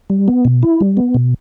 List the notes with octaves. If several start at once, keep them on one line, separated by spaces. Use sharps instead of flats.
G3
B3
B2
E4
G3
B3
B2